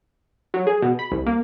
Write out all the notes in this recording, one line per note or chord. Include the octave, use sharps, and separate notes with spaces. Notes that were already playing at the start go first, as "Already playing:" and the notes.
F#3
G#4
B2
B5
C2
A#3